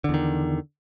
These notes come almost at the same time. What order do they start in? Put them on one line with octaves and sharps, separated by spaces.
D3 E2 D#3